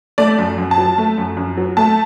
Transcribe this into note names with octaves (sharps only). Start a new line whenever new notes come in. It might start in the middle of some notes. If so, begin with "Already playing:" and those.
A3 D5
F#2
F#2
A5
F#3
A3
F#2
F#2
F#3
A3 A5